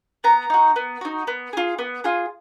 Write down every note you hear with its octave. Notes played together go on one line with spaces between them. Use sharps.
B3 A#5
D#4 F#4
B3
D#4 F#4
B3
F4 G#4
B3
F4 G#4